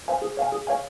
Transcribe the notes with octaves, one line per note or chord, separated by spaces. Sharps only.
C5 F5 G#5
G#4
C#5 F5 G#5
G#4
C#5 F5 G#5